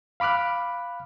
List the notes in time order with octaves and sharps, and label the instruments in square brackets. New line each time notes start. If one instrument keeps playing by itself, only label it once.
[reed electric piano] F5 B5 D6 F6 F#6